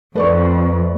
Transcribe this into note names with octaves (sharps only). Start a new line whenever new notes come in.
F2 A3 B4 D5 C#6